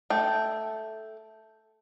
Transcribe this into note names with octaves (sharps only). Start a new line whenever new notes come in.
A3 G5